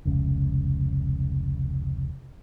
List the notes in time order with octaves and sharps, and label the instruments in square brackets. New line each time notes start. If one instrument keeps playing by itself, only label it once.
[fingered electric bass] F1 C#2 C#3